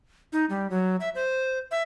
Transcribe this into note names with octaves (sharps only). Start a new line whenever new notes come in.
D#4
G3
F#3
E5
C5
E5